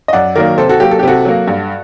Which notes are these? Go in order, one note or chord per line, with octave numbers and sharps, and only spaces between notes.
D#5
F#2 D5 F#5
D#3 F#3 A#3 A#4 D5
C3 A4 C5
F#4 A4
F#3 A#3 G4
A4
G4
C3 F#4 A4
F#3 A#3
G2